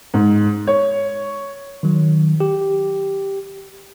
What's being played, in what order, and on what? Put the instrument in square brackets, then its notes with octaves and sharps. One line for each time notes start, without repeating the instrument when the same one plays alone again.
[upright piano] G#2
C#5
[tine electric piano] D#3 F#3
G4